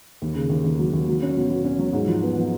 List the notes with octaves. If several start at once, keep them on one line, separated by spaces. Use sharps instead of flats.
D#2
C#3
D#2
D#2
F#3
D#2
F#3
C#4
B2
B2
C#4
F#3
G#2
F3
B3
F3